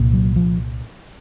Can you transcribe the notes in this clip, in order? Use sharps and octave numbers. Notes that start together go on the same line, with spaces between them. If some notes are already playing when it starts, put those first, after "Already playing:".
Already playing: C2 A#2
F#3
F3